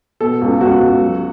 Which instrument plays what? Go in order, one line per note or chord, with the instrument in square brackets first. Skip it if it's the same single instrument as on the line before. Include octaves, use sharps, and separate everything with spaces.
[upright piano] B2 A4
C#2
C#2 F#4
C#2
F#3